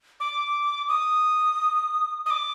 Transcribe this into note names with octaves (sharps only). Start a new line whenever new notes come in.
D6
D#6
D#6
D6